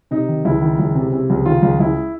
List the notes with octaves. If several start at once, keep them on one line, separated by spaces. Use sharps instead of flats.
C3 D#4
D#3
C#2 E4
D#3
C#2
C3
C3
C#2
D#3 F4
C#2
C#2 E4